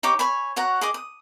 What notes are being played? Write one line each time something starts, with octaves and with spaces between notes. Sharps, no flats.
D#4 G4 C#5 D6
C#5 G#5 B5
F#4 C#5 F#5 A#5
G#4 D#5 D6
D#6